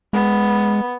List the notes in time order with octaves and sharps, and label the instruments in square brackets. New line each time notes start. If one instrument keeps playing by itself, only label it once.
[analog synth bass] G#3 [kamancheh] B3